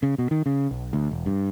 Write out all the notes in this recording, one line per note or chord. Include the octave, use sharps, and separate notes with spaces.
C#3
B2
D#3
C#3
B1
D2
E1
G2